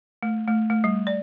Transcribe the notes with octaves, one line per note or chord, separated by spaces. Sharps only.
A3
A3
A3
G3
D5